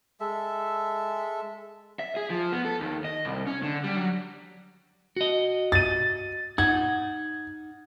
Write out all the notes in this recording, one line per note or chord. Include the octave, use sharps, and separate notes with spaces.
G#3 A4 E5
E5
G#4
F3
B3
A4
D#2
D#5
C2
C#4
D3
G3
F#3
F#4 D#5
A6 D#7
D#4 F#5 G#6